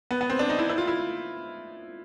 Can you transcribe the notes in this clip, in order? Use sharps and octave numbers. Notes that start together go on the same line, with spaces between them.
B3
B3
C4
D4
D#4
E4
E4
F4
E4